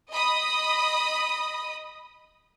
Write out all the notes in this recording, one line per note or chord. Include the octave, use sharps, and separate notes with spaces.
D#5 B5 D#6